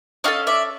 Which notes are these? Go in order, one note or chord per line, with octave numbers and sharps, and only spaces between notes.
C#4 F#4 A4 D#5 F5
D5 E5